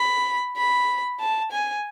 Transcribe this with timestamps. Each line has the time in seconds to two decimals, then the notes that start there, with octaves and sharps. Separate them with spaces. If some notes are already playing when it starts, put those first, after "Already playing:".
Already playing: B5
0.56 B5
1.20 A5
1.52 G#5